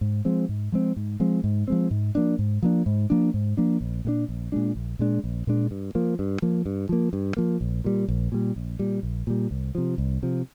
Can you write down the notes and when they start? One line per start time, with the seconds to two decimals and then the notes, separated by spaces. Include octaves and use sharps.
0.01 G#2
0.25 F3 G#3 C4
0.49 G#2
0.72 F3 G#3 C4
0.96 G#2
1.20 F3 G#3 C4
1.44 G#2
1.68 F3 G#3 C4
1.91 G#2
2.15 F3 A#3 D4
2.39 G#2
2.62 F3 A#3 D4
2.86 G#2
3.10 F3 A#3 D4
3.34 G#2
3.57 F3 A#3 D4
3.81 A#1
4.05 A#2 G#3 D4
4.29 A#1
4.52 A#2 G#3 D4
4.75 A#1
4.99 A#2 G#3 D4
5.24 A#1
5.47 A#2 G#3 D4
5.71 G2
5.95 F3 A#3
6.19 G2
6.42 F3 A#3
6.66 G2
6.89 F3 A#3
7.13 G2
7.37 F3 A#3
7.61 A#1
7.84 A#2 G3
8.08 A#1
8.32 A#2 G3
8.56 A#1
8.79 A#2 G3
9.03 A#1
9.27 A#2 G3
9.51 C2
9.75 C3 F3
9.98 C2
10.23 C3 F3